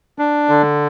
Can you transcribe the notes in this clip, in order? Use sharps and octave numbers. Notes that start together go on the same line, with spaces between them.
D4
D3